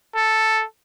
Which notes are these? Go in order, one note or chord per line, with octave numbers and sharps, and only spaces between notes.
A4